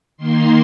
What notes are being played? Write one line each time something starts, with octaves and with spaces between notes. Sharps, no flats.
D#3 A#3 C6